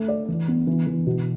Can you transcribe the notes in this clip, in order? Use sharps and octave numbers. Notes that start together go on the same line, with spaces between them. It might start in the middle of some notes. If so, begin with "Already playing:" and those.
Already playing: A3
D5
E3
B3
E3
E3
B2